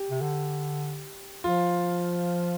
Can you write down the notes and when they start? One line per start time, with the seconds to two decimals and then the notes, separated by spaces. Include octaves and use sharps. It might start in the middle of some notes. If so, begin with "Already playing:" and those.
Already playing: G4
0.11 C3
0.21 D3
1.44 F3 F4